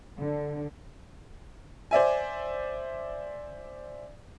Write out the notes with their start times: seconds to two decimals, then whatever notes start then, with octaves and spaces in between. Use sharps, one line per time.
0.18 D3
1.91 C5 D5 E5 G#5